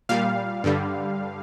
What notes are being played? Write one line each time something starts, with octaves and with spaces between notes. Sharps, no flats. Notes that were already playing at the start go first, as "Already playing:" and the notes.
A#2 G3 F5
G2 D3 G3